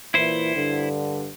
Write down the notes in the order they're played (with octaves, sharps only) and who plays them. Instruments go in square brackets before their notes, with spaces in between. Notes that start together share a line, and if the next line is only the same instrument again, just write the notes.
[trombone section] A#2 E3 [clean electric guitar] E4 C5
[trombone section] G2 D3